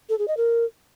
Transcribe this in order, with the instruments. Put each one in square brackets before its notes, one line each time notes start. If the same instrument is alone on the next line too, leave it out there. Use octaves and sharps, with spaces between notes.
[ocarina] A4
G#4
D#5
A#4